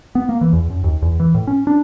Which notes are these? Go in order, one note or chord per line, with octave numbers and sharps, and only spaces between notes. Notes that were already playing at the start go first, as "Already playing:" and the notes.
B3
A#3
E3
E2
F#2
D#2
E2
E3
A2
C#4
D4